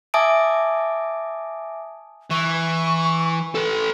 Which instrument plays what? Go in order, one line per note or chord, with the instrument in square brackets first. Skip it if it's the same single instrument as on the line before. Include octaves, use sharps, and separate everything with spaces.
[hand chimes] E5 G#5 A5 D6 D#6 D7
[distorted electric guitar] E3 [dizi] C#6
[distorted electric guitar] A4 B4